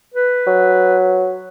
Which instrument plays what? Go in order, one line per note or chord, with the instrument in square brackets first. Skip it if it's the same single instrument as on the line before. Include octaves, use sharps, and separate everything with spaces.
[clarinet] B4
[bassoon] F#3